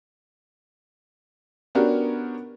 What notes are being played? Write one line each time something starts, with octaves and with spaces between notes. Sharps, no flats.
B3 C#4 D4 F#4 G4 A#4